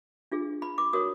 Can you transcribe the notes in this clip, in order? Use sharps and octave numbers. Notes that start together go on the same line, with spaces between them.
D4 F4 G#4
B5
D6
F#4 A#4 C#5 D#6